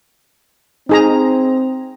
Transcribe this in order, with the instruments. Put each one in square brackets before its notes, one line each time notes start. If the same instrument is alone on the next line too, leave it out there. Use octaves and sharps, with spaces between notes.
[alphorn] C4 [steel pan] D#4 G#4 A#5